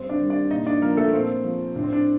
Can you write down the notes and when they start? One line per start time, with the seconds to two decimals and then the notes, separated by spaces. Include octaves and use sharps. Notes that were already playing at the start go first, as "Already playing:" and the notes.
Already playing: G2 C4 C5
0.09 D4 D5
0.20 D#3 G3
0.30 D4 D5
0.50 A#2 D#4 D#5
0.66 D4 D5
0.82 F3 A#3 A#4
0.97 A3 A4
1.13 A#2 C4
1.44 F3
1.75 A2 D4
1.84 C4
1.93 D4